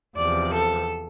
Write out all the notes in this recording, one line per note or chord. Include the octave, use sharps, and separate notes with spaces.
E2 C3 F3 D5
A4